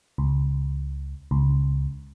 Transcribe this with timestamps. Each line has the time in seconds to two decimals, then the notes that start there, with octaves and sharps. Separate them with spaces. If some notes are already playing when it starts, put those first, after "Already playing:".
0.18 C#2
1.31 C#2